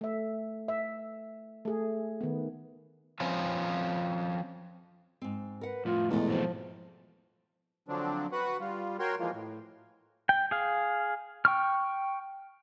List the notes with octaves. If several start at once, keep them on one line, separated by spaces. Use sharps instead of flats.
A3 E5
E5
A3 G#4
D#3 B3
F3 C4 C#4 B4
G#2 C4
A#4 B4 F#5
F2 A2 F4
E2 B2 G#3 A3
G#2 F3 F#3 C4
D3 F3 F#3 C4 D4
F#4 B4 F#5
G3 F4
F#4 A#4 C#5 G5 C6
E3 F3 G#3 A#3 F4
A2
G5
G#4 F5
G5 C#6 F6